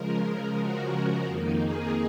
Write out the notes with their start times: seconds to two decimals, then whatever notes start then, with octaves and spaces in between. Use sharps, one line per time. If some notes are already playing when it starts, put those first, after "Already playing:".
Already playing: C#3 F3 G#3 A#4
0.23 A#4
0.58 F#4
1.25 F2 D#3 A#3 D#4
1.60 G#4